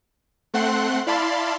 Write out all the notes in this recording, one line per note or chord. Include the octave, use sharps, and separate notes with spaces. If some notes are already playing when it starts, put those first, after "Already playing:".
A3 C4 F#5 C6 F#6
E4 D5 F5 A5 B5 C6